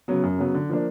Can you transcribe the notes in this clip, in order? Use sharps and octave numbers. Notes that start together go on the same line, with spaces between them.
C#3 F#3 B3
F#2
C#3 F#3 B3
D3
F3 A#3 D4